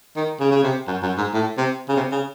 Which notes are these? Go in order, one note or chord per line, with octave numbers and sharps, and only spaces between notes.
D#3
C#3
C#3
C3
F#2
F#2
G#2
A2
C3
C#3
C3
C#3